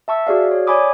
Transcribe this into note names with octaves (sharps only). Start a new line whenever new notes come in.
E5 A5 C#6 E6
F#4 G#4 D5 F5
C#5
C#5 D5 G#5 B5 D6 D#6